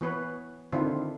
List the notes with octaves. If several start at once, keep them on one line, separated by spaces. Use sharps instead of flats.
E3 B3 B4 C#5
D3 D#3 C4 D4 E4 F4